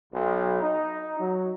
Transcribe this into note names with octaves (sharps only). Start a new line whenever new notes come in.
B1
D#4
F#3